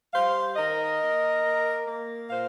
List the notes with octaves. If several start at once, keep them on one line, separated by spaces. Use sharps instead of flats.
G3 C5 F5
D#3 A#4 D#5
A#3
A#3
A#3
A#2 C5 F5